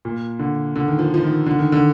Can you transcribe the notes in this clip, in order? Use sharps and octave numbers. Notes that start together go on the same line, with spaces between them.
A#2
D3
D3
D#3
F3
F3
D#3
D3
D#3
D3